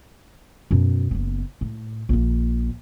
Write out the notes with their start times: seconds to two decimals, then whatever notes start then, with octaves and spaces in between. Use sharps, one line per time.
0.71 F#2 B2
1.11 F#1 B3
1.61 A2
2.09 A#1 A#3